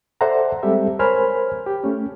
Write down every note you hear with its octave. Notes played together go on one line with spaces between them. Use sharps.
A4 C5 D5 E5 F#5 A#5
G3 G#3 C4 G4 A4 E5
A#4 C5 C#5 G#5 B5 F6
G4
A3 C#4